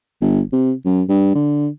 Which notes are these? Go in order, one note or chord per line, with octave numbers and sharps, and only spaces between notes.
G1
C3
F#2
G2
D3